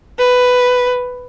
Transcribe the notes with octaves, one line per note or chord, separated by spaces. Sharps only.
B4